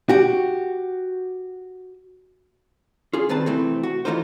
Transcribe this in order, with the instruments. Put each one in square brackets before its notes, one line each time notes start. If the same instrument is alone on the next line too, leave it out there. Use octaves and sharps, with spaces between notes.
[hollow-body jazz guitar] F#4 G4
F4 G#4
C2 D#3 C4 B4 A5
C3 E3 A3 C4
F#4
E3 G3 A3 D#4 F4 C5